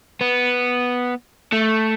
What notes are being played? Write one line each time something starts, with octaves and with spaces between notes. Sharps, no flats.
B3
A3